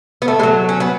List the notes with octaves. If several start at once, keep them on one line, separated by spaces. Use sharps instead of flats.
B3
A3 A4
G#3
F#3
C#4
B3